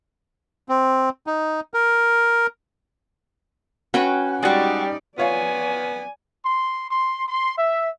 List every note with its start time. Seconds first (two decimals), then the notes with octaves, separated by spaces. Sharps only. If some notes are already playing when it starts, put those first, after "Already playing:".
0.69 C4
1.27 D#4
1.74 A#4
3.94 C#4 F#4 B4 G5
4.43 G3 G#3 D#4 F#4 D5
5.18 B3 F4 C#5 D5 F5 G#5
6.44 C6
6.91 C6
7.28 C6
7.57 E5